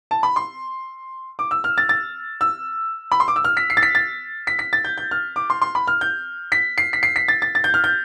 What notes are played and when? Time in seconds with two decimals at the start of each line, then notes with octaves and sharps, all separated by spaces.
0.11 A5
0.23 B5
0.36 C6
1.39 D6
1.51 E6
1.64 F6
1.78 A6
1.89 A6
2.41 E6
3.12 B5
3.20 C6
3.28 D6
3.36 E6
3.45 F6
3.57 B6
3.70 C7
3.77 A6
3.83 B6
3.95 A6
4.47 B6
4.59 B6
4.73 A6
4.85 G6
4.98 G6
5.11 F6
5.36 D6
5.50 C6
5.62 C6
5.75 B5
5.88 F6
6.01 G6
6.52 B6
6.78 C7
6.93 B6
7.03 C7
7.16 B6
7.28 A6
7.42 A6
7.55 A6
7.64 G6
7.74 F6
7.84 G6